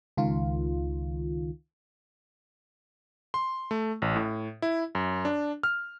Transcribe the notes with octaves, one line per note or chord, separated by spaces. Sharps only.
C#2 D#3 F4
C6
A3
A1
A2
E4
F#2
D4
F6